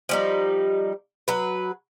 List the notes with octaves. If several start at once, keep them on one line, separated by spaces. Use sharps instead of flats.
F3 G3 D#4
F#3 B4